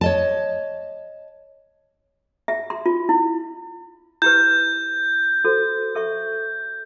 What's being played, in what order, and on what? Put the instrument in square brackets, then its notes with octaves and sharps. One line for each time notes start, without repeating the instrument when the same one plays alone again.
[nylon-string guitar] C#5 D#5 A5
[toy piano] E5
C6
F4
E4
[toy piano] E4 G4 B4 [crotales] G6
[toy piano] F#4 A4 C5
A4 E5 C#6